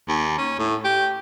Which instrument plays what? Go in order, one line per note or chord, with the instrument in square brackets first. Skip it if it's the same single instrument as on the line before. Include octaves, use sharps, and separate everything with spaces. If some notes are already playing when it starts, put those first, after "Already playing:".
[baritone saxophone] D#2
C#4
A2
G4